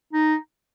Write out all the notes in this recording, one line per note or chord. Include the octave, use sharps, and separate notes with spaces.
D#4